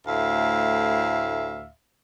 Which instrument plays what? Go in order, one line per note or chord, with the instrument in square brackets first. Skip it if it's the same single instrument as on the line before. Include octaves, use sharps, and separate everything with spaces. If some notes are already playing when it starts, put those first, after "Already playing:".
[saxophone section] D2 A2 E5 F5